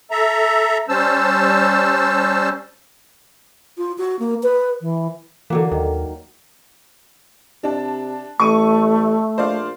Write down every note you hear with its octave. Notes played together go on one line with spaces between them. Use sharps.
A4 E5 A#5
G3 C#4 C5 A5 E6
F4
F#4
A#3
B4
E3
D3 E3 F#3 A#3
D#2 D#3
C3 D4 A5
A1 A3 C#6 D#7
A#1 C5 D5 F5